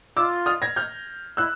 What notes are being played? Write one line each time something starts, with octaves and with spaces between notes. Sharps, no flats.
F4 D6 E6
D#6 F6
G#6 A#6
F6 G6
E4 E6 F#6